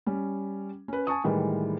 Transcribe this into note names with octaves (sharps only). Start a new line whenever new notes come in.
G3 C#4
C#4 B4
G#5 A5 C#6 D#6
A2 D#3 E3 G3 G#3